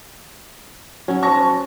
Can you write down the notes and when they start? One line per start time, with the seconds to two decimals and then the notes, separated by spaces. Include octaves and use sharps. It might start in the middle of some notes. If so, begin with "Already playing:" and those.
1.08 F#3 C#4
1.23 C5 C#5 A5 C#6 A#6